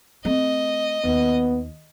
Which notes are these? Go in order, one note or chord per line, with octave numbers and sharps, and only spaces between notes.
A3 C4 D#5
D#2 B3